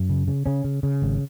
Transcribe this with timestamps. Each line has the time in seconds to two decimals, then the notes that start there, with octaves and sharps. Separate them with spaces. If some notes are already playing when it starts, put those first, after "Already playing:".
Already playing: F#2
0.09 C#3
0.28 C#3
0.46 C#3 C#4
0.64 C#3
0.83 C#3
1.02 G#1